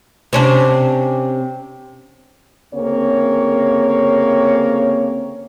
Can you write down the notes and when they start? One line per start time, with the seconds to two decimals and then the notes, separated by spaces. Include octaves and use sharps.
0.33 C3 C#4 D4
2.73 D2 C#3 A#3 C4 C#5